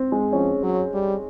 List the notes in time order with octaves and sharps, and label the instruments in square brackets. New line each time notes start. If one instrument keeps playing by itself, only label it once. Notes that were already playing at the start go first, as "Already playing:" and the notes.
Already playing: [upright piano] C4
G#3
[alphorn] F3 [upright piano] C#4
[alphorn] F#3
G3